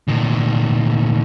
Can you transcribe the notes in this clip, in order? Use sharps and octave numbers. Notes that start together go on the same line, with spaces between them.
D2 A#2